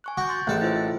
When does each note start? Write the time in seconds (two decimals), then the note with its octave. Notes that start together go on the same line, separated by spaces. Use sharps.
0.04 G#5 C#6 F#6
0.17 F#4 D6 G6
0.29 C6 G6 A6
0.47 A1 G#4 A4 D#5 F#6
0.62 E4 F4 C5